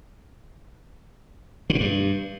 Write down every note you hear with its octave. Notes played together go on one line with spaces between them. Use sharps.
D3
B2
G2